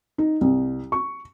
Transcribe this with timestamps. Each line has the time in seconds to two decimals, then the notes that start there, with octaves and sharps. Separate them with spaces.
0.18 D#4
0.41 C2
0.92 C#6